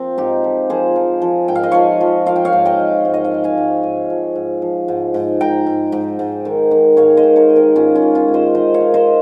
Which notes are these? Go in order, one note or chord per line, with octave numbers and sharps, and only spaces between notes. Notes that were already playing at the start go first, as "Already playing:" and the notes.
Already playing: F3 C4
G#2 D#4 G4
F3
F3 G#4 C5
F3
F3
G#2 G5
F5
D#5
F3 C#5 F5
F3
F3 F5
G5
C#5 F5
G#2
D#5 G5
F3
G#2
D#5
F5
G#2 G5
F5 G#5
G#2
G#2
F3
G#2
F3
G#2
G#2
G#2 G5 A#5
G#2
G#2
G#2
D#3
D#3
G#2 C#5 F5
C5 D#5
D#3
A#4 C#5
D#3
G4 A#4
G#2 C#4 F4
C#4 F4
D#3
C#4 F4
G#2
C5 D#5
D#3 C5 D#5
C#5 F5
D#3
C5 D#5